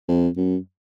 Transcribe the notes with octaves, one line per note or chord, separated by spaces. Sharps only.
F2
F#2